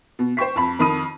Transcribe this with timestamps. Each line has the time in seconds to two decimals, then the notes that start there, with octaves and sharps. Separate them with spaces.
0.19 B2
0.37 C5 G5 C#6 B6
0.56 F2 B5
0.79 F2 D#3 B5 D#6 D#7